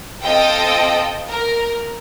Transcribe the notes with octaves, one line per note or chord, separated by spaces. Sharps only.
C4 F4 A4 D#5 G5
A#4